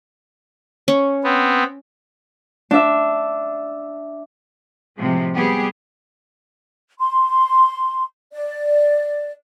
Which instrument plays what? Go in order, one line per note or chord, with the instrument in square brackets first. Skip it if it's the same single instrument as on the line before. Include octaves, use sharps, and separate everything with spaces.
[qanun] C#4 C#6
[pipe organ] B3 C4
[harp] D4 E5
[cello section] A2 C3 F3 G#3
G3 B3 G4 G#4
[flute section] C6
D5